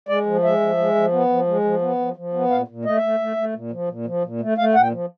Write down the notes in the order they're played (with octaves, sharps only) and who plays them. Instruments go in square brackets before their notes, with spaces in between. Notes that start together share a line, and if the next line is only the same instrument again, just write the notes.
[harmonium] G#3 D5
F3
G#3 E5
F3
G#3
F3
B3
F3
G#3
F3
B3
F3
F3
B3
A#2 F5
A#2
A3 D#5
E5
A3
A3
A3
A#2
F3
A#2
F3
A#2
A3
A3 F5
A#2 F#5
G5
F3